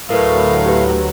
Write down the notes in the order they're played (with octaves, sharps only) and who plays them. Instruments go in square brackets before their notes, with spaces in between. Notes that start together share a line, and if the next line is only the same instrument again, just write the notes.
[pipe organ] D2 F#3 [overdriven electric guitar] A2 [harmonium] A3 F5 [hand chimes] A#4 B4
[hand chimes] G4 B4